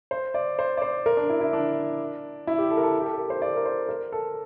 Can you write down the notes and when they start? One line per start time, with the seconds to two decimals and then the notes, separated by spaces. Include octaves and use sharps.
0.11 C5
0.34 D5
0.59 C5
0.77 D5
0.82 C5
1.06 A#4
1.17 D4
1.30 E4
1.41 E4
1.53 D4
2.47 E4
2.58 G4
2.71 A4
2.77 A#4
2.83 A4
3.00 G4
3.06 A4
3.18 A#4
3.30 C5
3.42 D5
3.56 A#4
3.65 C5
3.89 A#4
4.12 A4